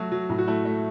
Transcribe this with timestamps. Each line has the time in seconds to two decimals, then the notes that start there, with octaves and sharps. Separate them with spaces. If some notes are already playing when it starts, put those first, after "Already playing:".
Already playing: F#3 A3 F#4
0.12 F#3
0.29 A2
0.38 F#4
0.47 A3 E4
0.65 A3